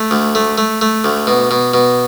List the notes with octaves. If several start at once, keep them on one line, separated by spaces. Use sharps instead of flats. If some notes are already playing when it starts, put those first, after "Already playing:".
Already playing: A3
D2
A3
A3
A3
D2
B2
B2
B2